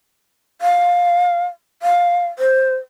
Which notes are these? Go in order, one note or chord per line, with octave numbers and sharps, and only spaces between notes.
F5
F5
C5